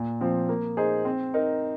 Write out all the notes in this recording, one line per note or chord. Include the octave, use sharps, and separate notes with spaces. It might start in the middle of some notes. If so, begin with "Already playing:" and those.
Already playing: A#2
F3 C4
A#3
D#4 G#4 C5
C4
D#4 A#4